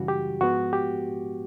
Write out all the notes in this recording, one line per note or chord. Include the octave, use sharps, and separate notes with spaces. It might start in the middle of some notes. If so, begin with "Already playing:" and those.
Already playing: F#2 C#3 E3 G3 F#4
G4
G#2 F3 G#3 B3 F#4
G4